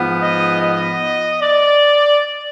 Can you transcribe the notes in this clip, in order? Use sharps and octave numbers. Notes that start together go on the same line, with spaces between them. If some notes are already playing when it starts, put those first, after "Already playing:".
Already playing: G#2 F3 B3
D#5
D#5
D5